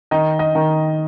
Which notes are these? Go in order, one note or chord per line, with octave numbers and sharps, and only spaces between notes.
D#3 D#5
D#5
D#3